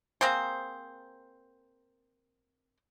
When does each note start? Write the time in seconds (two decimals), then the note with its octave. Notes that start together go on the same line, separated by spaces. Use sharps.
0.21 A#3 C4 G#4 C5